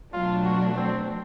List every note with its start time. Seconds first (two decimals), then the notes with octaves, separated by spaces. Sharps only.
0.13 B2 F#3 A3 D4 F4
0.45 F#4
0.76 C4